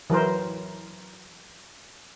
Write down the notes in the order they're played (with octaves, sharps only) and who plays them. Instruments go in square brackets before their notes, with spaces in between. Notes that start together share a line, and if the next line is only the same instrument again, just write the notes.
[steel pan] E3 F#3 A#4 C5